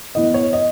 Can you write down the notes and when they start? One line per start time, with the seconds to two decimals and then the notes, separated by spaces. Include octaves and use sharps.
0.15 A2 E3 B3 D#5
0.34 C#5
0.53 D#5